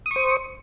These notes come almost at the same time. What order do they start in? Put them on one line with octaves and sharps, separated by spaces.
D#6 C#6 C5